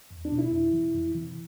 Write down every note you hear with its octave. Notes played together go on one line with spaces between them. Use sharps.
E2
D4
B2
E4
F2
C3 E3
F2
C3 E3